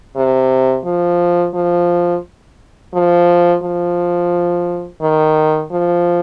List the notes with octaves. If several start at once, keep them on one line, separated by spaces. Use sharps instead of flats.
C3
F3
F3
F3
F3
D#3
F3